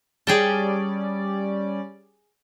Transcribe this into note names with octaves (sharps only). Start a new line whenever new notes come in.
G3 C#4 G#4 D5 G5 A5